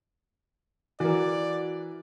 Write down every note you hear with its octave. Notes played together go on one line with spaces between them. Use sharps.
E3 F#4 A#4 D5